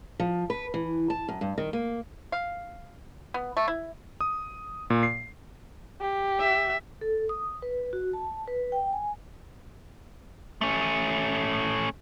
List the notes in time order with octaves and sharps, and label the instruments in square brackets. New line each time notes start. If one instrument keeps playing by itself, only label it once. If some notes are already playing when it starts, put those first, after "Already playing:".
[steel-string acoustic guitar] F3
B4
E3
A5
F#2
G2
D#3
A#3
[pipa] F5
B3
A3
E4
[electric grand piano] D#6
A#2
C7
[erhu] G4
[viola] E5
[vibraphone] A4
D#6
B4
F#4
A5
B4
G5
G#5
[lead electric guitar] A3 C#4